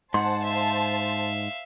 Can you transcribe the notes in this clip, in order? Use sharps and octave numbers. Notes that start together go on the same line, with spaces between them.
G#2 C5 F#5 A5 C6
E5 F5